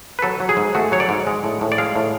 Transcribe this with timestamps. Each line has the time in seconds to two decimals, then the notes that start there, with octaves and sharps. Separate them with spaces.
0.19 B4
0.22 F#3 A4
0.40 F#3
0.49 G#4
0.57 G#2
0.75 A3 F#4
0.92 F#3 C#5
1.00 D5
1.09 G#2
1.27 G#3
1.44 A2
1.61 A2
1.72 D5
1.78 G#3 F5
1.96 A2